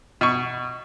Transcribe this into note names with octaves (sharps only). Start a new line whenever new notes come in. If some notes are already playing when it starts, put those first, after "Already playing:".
B2 C#6